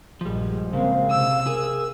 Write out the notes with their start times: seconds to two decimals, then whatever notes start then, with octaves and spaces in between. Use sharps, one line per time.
0.21 A#1 G2 F3 G3 G#3
0.73 C#3 G#3 A#3 C4 F5
1.10 C3 E6
1.47 G#4 A#4